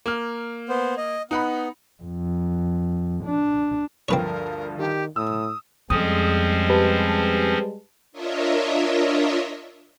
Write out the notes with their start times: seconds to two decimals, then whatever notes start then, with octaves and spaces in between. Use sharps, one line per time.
0.06 A#3 F6
0.69 B3 C5
0.97 D#5
1.31 B3 D#4 F#5 B5
2.03 F2
3.25 D4
4.08 D2 G2 F3 C4 A#4 B4 C#5
4.78 D#3 G4
5.16 A2 D#6 E6
5.90 F2 F3 G3 G#3 C4 C#4 D#6
6.69 G4 B4 A5
8.12 D4 F4 A#4 C#5 D#5 E5